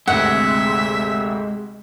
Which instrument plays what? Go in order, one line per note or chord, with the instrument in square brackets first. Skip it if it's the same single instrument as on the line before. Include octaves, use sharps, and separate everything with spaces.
[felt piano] G#1 D2 C3 [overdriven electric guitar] G#3 [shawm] E5 [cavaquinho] F#5